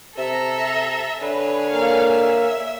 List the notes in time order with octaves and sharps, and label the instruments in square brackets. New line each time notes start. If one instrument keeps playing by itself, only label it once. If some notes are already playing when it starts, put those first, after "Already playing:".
[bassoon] C3 [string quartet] A4 A#5 [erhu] E5
[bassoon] D3 [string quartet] G#4 C#5 [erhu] B4
[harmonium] A#3 A#4 [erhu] F5
[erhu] E5